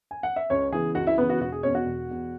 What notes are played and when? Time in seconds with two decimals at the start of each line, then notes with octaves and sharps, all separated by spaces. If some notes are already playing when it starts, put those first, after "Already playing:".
0.11 G#5
0.23 F#5
0.36 E5
0.50 C#2 C#4 C#5
0.72 C#3 E3 B3 G#4 G#5
0.95 C#2 F#4 F#5
1.07 E4 E5
1.18 C#3 E3 B3 B4
1.30 F#4
1.40 E1 F#4
1.52 G#4
1.63 B2 C#4 C#5
1.67 E2
1.75 F#4 F#5
1.86 E1
2.09 E2 B2